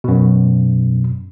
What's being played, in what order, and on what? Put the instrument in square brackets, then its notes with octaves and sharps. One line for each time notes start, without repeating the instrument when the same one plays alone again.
[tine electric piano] F#2 B2